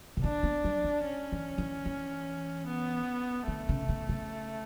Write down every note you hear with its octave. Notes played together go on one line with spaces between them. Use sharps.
C#3
D3 D4
B3
G3
E3
C#4
E3
E3
E3
B3
D3 A3
C#3
C#3
C#3